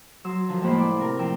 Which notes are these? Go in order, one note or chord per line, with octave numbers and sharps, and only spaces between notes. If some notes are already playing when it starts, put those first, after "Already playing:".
F#3 C6 E6
D3 F3 A#4
F2 A2 G#3 A#3 C5 B5
E4 A4 D5
C3 A#4
A2 F3 G5 E6